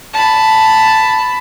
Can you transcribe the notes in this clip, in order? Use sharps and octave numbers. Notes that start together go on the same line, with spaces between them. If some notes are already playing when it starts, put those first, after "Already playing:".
A5 B5